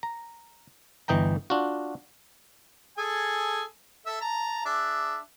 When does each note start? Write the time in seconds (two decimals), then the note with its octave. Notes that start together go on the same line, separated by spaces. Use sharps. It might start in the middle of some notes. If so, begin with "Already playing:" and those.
0.03 A#5
1.08 G1 E3 D#5 G5 A#5
1.50 D4 F4 F#4
2.98 G#4 A4 G#5
4.06 A4 E5
4.21 A5 A#5
4.65 D4 G#4 E5